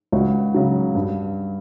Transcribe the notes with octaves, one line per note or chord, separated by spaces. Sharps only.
C#2 F#4
C#3 F#3
G2